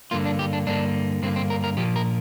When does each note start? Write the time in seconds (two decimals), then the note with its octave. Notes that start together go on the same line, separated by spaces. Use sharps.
0.11 G2 D3 A#3 F4
0.25 D4
0.39 G4
0.53 D4
0.67 G2 D3 A#3 D4
1.22 G2 D3 A#3 C4
1.36 C4
1.50 A#4
1.64 A#4
1.77 A#2 F3 A#3 G4
1.96 A#4